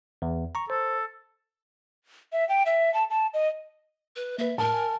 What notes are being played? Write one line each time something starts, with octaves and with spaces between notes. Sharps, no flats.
E2
A#5 C#6
A4 C5
E5
G5
E5
A5
A5
D#5
B4
A#3 B4 E5
A2 A#4 A5
G#5